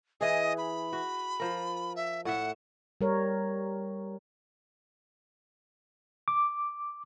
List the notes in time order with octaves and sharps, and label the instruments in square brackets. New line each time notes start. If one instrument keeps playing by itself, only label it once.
[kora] E3 G#4 [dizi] D#5
[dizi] B5
[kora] F#4
F3 A#4
[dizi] E5
[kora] A2 E5 [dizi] F#5
[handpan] G3 A#4 C#5
[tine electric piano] D6